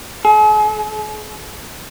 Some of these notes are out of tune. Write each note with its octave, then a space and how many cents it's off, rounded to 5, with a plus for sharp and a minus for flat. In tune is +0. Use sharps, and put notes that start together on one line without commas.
G#4 +45